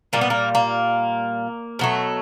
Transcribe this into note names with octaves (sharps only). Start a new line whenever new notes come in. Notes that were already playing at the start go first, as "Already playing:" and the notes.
A#2 G3 A#3
B3
A#3
A#3
B2 F#3 A3